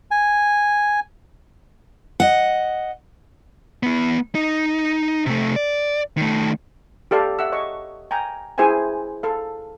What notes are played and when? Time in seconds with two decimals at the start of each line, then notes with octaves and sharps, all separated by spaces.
0.11 G#5
2.20 D#5 F#5
3.83 B3 E4
4.35 D#4
5.26 C3 A3
5.56 D5
6.17 D#3 A3
7.11 G4 A4 D5 F5
7.39 E5 F#5 E6
7.52 C#5 D#5 C#6
8.11 G5 G#5 A#5
8.58 E4 G#4 C5 E5 G5 G#5
9.23 A4 F5